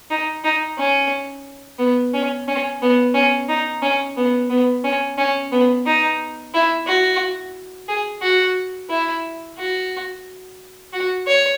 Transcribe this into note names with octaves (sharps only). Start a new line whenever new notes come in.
D#4
D#4
C#4
B3
C#4
C#4
B3
C#4
D#4
C#4
B3
B3
C#4
C#4
B3
D#4
E4
F#4
G#4
F#4
E4
F#4
F#4
C#5